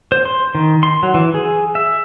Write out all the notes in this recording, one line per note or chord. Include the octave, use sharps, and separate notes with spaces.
C5
C6
D#3
C6
F#3
E3
G#4
E5